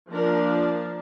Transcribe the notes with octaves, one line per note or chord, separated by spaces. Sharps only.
F3 A#3 D4 A#4